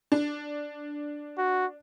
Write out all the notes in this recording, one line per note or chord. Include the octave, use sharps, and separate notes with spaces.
D4
F#4